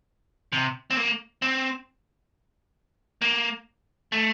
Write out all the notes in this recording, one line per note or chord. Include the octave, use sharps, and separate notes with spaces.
C3
C4
A#3
C4
A#3
A3